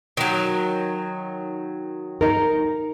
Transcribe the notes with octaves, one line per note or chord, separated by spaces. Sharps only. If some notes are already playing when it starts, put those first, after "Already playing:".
D#3 F#3
D#4 A#4